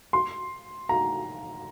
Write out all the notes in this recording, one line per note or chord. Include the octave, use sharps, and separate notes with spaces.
C6
A#5